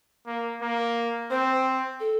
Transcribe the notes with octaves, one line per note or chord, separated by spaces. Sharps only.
A#3
A#3
C4 C5
A4